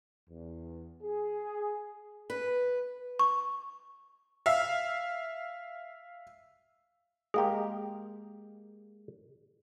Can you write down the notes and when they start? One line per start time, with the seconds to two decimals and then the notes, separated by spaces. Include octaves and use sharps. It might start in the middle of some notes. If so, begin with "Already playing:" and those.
0.30 E2
1.03 G#4
2.30 B4
3.19 C#6
4.46 E5 F5
7.34 G#3 A#3 G4 G#4